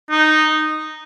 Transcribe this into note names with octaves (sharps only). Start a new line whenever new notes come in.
D#4